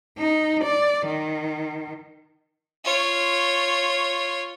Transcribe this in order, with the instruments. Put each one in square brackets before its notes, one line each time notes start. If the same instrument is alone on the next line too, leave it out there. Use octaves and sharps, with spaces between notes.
[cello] D#4
D5
D#3
[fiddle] F4 C#5